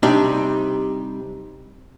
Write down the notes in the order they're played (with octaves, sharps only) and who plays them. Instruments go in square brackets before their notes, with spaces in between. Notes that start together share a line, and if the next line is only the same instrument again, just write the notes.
[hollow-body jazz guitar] C3 G3 D4 D#4 G4